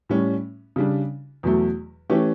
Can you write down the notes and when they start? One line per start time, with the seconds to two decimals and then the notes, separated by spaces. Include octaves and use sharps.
0.09 A2 G3 C#4
0.76 C#3 G3 D4
1.43 E2 B2 F#3 A3
2.10 E3 A3 C#4 G4